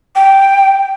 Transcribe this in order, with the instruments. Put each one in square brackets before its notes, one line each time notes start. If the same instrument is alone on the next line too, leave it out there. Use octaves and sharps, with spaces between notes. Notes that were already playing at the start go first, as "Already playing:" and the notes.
[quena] G5